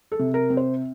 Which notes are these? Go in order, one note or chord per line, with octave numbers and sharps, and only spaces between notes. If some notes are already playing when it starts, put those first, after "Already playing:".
A4
C3
A#4
C4
C5